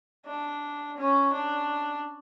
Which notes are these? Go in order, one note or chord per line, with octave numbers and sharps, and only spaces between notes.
D4
C#4
D4